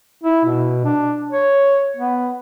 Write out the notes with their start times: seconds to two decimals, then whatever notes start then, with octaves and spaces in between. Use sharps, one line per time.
0.23 E4
0.45 B2
0.84 D4
1.31 C#5
1.97 B3